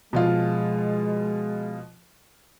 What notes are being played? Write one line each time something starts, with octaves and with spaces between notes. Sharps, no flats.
B2 F3 G#3 F4